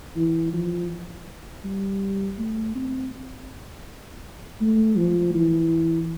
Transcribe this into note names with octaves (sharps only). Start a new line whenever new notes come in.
E3
F3
G3
A3
C4
A3
F3
E3